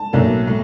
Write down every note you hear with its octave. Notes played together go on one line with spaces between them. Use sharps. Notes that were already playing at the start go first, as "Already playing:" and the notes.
Already playing: A5
B1 A2 F#3 A#3
A2